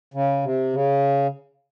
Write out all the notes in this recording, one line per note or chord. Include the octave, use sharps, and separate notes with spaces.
C#3
C3
C#3